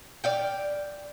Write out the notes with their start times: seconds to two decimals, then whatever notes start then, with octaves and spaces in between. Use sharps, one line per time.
0.24 D5 F5 G5